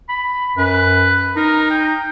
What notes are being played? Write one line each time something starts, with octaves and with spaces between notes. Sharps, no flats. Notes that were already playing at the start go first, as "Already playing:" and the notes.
B5
F#2 B4
D#4 A#4
G5